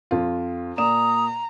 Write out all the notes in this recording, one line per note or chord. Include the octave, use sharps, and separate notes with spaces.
F2 F4
A#2 D5 A#5 D#6 E7